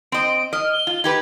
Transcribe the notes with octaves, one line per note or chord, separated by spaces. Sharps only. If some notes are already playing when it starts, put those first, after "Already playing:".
C4 D#5 D7
D#5 F6
G7
F4
D#4 G4 B4 G#6